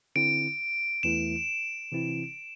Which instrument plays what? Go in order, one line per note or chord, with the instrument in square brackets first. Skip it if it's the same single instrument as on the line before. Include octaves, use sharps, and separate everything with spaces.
[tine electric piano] D3 C4 E4 [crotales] D7
[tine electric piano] E2 E3 A3 E4 [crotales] E7
[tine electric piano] C3 E3 C4 E4